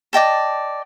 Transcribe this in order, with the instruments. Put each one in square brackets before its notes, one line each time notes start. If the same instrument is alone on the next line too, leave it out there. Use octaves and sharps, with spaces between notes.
[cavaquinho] D5 D#5 G5 A5